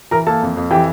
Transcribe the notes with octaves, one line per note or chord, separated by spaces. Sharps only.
E3 A#4 A#5
A#3 A4 A5
F2
F2
E3 G4 G5